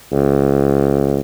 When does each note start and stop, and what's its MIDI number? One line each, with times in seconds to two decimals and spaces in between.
0.12 1.21 37